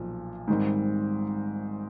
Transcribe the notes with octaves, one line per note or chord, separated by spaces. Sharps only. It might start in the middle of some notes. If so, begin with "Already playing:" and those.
Already playing: B1 A#2 F3
G#2 D#3 G3 C4